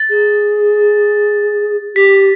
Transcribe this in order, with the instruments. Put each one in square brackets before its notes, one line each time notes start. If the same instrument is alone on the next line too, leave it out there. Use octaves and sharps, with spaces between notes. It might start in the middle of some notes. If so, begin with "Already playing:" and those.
Already playing: [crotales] A6
[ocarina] G#4
[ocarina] G4 [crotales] B6